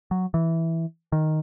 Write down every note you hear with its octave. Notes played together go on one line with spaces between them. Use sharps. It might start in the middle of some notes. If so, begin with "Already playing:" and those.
F#3
E3
D#3